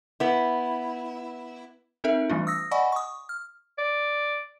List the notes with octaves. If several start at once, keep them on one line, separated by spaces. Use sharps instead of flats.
B3 E4
C4 D#4 A4 A#4 E5
E3 G3 A3 D4 F4
D#6 E6 A#6
D5 D#5 F#5 G#5 B5 C#6
C#6 D#6
F6
D5